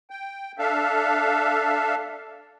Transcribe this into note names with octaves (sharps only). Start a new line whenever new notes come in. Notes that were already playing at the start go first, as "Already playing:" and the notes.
G5
D4 A4 E5 F5